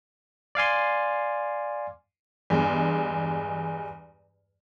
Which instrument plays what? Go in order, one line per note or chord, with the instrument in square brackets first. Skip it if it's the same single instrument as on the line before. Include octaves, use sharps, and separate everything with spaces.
[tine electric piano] D5 F5 G#5 C6
[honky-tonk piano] E2 G2 G#3